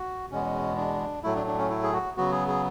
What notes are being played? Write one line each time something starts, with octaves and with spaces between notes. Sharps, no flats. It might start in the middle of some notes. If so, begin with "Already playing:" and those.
Already playing: F#4
E2 B2 G#3 B3 C#4
D4
A2 F#3 A3 E4
D4
D4
C#4
E4
G#4
F#4
C#3 F#3 B3 F#4
G#4
G#4